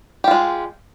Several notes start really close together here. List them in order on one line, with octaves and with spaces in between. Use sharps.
G4 F4 G#3